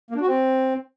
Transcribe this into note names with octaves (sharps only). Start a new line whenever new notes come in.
A#3
D4
F#4
C4